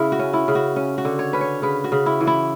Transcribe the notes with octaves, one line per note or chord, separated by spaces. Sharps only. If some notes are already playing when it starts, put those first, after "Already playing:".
Already playing: C#3 E4
F#4
C#4
E4
C#3
F#4
C#4
F#4
D3
C#5
C#4 B4
C#5
C#3 B4
F#4
C#3
E4
E3
E4